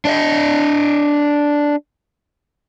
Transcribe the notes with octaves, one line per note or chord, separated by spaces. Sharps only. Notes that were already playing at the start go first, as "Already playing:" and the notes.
D4 D5 D#5